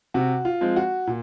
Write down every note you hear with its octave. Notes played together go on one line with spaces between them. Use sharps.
C3 F#4
F4
F3 G#3 C4
F#4
A#2